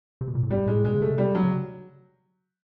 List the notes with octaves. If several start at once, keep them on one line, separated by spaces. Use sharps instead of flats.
C3
B2
A#2
A2
G#2 G3
A2 G#3
B2 G#3
C#3
C3 A3
G3
F#3
C#3